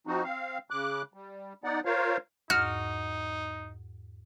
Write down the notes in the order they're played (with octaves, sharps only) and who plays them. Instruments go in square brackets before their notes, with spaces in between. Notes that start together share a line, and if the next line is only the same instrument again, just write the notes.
[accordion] F3 C4 D#4 F#4
C4 F5
C#3 D6 F#6
G3
B3 D#4 D5 F#5
F4 A#4 C5 C#5 F5
[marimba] E2 G#2 [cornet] D#4 [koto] F#4 [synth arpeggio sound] F6